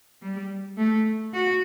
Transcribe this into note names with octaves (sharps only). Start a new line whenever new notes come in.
G3
A3
F#4